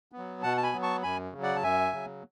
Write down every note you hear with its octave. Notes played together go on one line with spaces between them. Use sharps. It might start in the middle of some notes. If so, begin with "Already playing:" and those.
B3
F#3
B2 F#5 A5
A5
G#5 B5
F#3 B3
A5 C#6
F#2 G#5 B5
C#3 F#3
D5 F#5
A5
F#2 E5 G#5
C#3 F#3